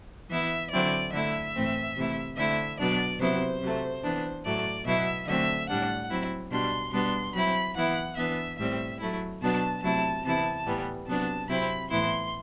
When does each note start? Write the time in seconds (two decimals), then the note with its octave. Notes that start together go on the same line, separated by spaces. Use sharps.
0.29 E3 B3 E4 E5
0.71 D3 F#3 C4 E4 D5
1.12 D3 A3 E4 E5
1.55 A2 E3 A3 C4
1.96 C3 E3 A3 E4
2.37 D3 A3 C4 E4 E5
2.78 B2 F#3 B3 D4 D5
3.20 C3 F#3 B3 E4 C5
3.61 C3 F#3 A3
4.03 E3 B3 D4
4.44 A2 F#3 A3 D5
4.85 B2 F#3 B3 E4 E5
5.27 D3 F#3 A3 C4 E5
5.68 A2 G3 D4 F#5
6.10 F#3 C4 E4
6.51 B2 G3 D4 C6
6.92 B2 G3 B3 D4 C6
7.34 F#3 C4 E4 B5
7.75 E3 B3 E4 F#5
8.17 E3 B3 D4 E5
8.58 A2 G3 C4 E5
9.00 F#3 A3 E4
9.41 B2 F#3 B3 D4 A5
9.82 C3 F#3 A3 E4 A5
10.24 C3 E3 B3 E4 A5
10.65 A2 E3 G3 B3
11.07 C3 F#3 B3 D4 A5
11.48 C3 F#3 C4 E4 B5
11.89 A2 E3 B3 E4 C6